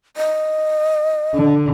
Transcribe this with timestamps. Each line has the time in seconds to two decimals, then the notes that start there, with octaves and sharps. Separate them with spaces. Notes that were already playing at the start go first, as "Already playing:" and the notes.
0.17 D#5
1.34 D3